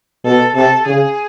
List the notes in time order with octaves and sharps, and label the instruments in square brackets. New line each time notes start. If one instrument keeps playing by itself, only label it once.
[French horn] B2 [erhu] A4
[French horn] C3 [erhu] A4
[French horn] C#3 [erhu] G#4